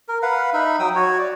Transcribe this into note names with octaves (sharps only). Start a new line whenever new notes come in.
A#4
B4 F5 F#5
D#4 E5 B5
F#3 G5 D#6 E6
F#4 C#5
D5